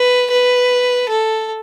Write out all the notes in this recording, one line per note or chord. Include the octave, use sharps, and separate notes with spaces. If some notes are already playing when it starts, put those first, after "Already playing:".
Already playing: B4
B4
A4